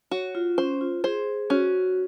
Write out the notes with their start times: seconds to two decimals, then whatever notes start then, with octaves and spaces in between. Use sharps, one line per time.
0.11 F#4 C#5
0.35 F4
0.58 C#4 C5
0.81 F4
1.04 G#4 C5
1.50 C#4 F#4